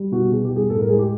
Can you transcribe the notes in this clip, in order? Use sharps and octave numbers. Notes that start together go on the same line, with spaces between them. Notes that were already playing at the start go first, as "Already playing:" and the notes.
Already playing: G3
B2 F#4
B2 G#4
G4
G3
G#4
A2 A4
A#4
G#3 G#4
G4